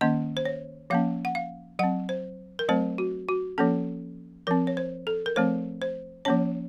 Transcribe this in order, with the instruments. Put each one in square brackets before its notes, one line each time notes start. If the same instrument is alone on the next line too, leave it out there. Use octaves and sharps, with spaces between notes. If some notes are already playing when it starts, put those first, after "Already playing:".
[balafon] D#3 A#3 C#4 D#5
C5
C#5
F3 A#3 C#4 F5
F#5
F5
F#3 C4 F#5
C5
A#4
F#3 A3 C4 C5
F#4
F#4
F3 A#3 C#4 A4
F3 C4 A#4
C#5
C5
A4
A#4
F3 A3 C4 C5
C5
F3 A#3 C#4 C#5